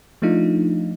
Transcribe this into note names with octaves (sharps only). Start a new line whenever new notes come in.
F3 A3 D4 D#4 F4